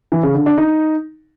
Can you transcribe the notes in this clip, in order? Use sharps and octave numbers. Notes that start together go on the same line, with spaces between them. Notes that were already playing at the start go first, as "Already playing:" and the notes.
E3
C#3
D3
D4
D#4